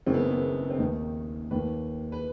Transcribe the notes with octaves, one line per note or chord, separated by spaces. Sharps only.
F#1 F#2 D#3 C4
B3
B3
C4
D#2 D#3 D#4
D#2 D#3 B4
B4